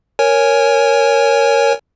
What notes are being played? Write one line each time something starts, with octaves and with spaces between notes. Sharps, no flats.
A#4 C#5 G#5